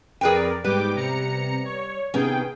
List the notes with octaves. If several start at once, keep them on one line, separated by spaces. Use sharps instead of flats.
F2 G#4 A#4 B4 D5 G5
G#2 G3 B3 B4 G5 D6
C3 A#5 C#7
C#5
C3 D#3 B3 C#4 G#4 G5